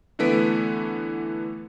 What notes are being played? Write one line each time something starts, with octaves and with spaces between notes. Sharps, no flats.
D3 E3 A3 B3 B6 D7